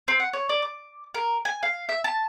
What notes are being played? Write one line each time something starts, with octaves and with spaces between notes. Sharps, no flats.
C4
F#5
C#5
D5
D6
A#4
G#5
F5
E5
A5